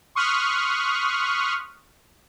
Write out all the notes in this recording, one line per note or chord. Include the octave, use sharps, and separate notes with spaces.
C6 C#6 D#6 F6 F#6 B6